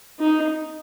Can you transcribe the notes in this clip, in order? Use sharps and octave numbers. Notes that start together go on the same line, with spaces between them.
D#4